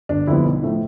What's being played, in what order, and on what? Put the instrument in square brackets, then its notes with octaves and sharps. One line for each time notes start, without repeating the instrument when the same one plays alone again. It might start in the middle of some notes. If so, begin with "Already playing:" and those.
[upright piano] G1 [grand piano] D4
[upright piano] F2 D3 G3 B3 [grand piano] E4
[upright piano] B1
A2 F3 A3